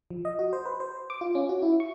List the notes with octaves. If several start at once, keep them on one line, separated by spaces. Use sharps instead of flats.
F3
D#5
F#4
C5
B4
C5
D6
F4
C#4
F#4
E4
C#6